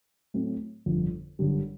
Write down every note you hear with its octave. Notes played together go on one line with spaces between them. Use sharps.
A2 F#3 A3 C4
G1 F2 D3
G1 F#2 D3 G3